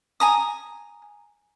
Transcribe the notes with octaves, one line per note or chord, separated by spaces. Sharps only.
G#5 A#5 D#6